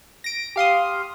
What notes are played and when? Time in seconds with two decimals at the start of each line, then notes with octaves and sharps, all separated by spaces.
0.24 A#6 D7
0.56 G4 F5 C6 D#6